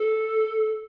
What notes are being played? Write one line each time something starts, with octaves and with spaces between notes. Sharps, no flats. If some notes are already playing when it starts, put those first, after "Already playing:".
Already playing: A4